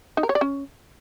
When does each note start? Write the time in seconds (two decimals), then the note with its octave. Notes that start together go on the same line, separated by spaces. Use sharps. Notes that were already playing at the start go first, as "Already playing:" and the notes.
0.17 D#4
0.23 A#4
0.29 C#5
0.35 D5
0.41 C#4